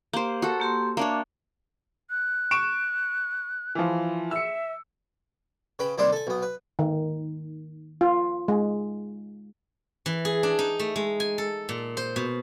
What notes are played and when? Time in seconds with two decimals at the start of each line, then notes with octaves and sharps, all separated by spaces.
0.13 A#3 G4 C5
0.42 F#4 A4
0.60 A#3 G4 C6
0.97 A#3 D4 C#5 E5
2.10 F#6
2.51 C#6 D7 E7
3.75 E3 F3
4.31 E5 E6 C#7
5.79 C#3 B4 G5 B5
5.98 D#2 C3 G3 D4 E4 C6
6.12 A4 G#5
6.27 B1 B3
6.42 B4
6.79 D#3
8.01 F4
8.48 G#3
10.06 E3
10.25 G#4
10.43 D4
10.59 D#4
10.79 A3
10.96 G#3
11.20 G#5
11.38 A4
11.69 A#2
11.97 C5
12.16 B2